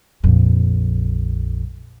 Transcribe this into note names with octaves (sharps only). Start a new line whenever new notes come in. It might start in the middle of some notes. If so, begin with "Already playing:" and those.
A#1 F2